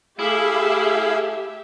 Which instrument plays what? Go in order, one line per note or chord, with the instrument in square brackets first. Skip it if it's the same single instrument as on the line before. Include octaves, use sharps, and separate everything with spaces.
[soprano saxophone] A3 [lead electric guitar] E4 [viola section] G4 E5 [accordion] G#4 F5